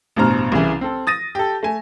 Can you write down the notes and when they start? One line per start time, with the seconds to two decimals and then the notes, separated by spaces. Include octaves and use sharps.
0.16 A1 G2 B2 C5 A#5 F6
0.52 C2 C#3 E3
0.81 C4 A4
1.07 D#6 A6 A#6 D#7
1.35 G4 A4
1.63 A3 G#5